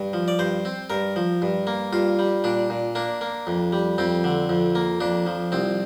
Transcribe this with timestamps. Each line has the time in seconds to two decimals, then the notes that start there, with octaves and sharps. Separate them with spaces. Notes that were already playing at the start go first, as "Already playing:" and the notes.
Already playing: G2
0.13 F3
0.28 D5
0.39 G2 C5
0.65 C4
0.90 G2 A#4
1.16 F3
1.42 G2
1.67 A#3
1.93 G2 F4
2.19 G3
2.44 A#2 D4
2.70 A#2
2.95 A#3 D4
3.21 A#3
3.47 F2
3.73 G3
3.98 F2 C4
4.24 D3
4.49 F2
4.75 A#3
5.01 F2 D4
5.26 F3
5.52 C2 C4